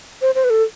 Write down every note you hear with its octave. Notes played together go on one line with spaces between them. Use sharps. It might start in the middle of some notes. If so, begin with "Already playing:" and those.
C5
C5
B4
A4